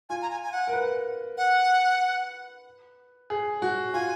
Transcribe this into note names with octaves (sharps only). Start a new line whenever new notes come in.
F4 G#5
A#5
G#5
G#5
F#5
A#4
B4
F#5
G#4
F#4
F4 G#5